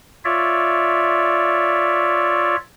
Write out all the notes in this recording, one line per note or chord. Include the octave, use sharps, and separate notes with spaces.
F4 C#5 D5 E5